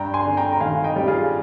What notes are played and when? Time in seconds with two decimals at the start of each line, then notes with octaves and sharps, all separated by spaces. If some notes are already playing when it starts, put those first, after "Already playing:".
Already playing: G2 G5 A#5
0.14 G#5 C6
0.25 D3
0.37 G5 A#5
0.53 A#5
0.60 G#1 F5 G#5
0.84 D#5 G5
0.96 G3
1.07 F4 G#4